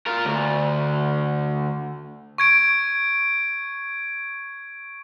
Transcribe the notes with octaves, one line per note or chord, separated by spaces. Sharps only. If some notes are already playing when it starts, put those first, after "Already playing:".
F4 A#4
D2
C#6 G#6 D7